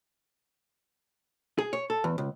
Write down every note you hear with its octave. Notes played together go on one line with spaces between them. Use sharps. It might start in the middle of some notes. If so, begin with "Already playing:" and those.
G#4
C#5
A4
E2
C#2